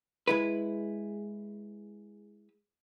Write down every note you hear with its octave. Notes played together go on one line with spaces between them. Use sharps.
G#3 E4 B4